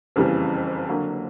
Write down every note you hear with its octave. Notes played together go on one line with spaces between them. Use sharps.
F#1 F2 C#3 E3 G3
D3 F#3 A#3